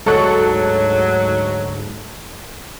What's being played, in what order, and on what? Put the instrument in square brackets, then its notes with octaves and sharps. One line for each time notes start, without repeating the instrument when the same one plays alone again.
[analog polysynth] D2 G#2 [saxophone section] F#3 [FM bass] G#3 [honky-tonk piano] A4 C#6 F#6